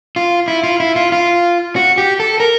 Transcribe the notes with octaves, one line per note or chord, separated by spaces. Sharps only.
F4
E4
F4
E4
F4
F4
F#4
G4
A4
A#4